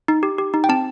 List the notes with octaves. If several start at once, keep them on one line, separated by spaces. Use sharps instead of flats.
D#4
G4
G4
D#4
G5
C4 A5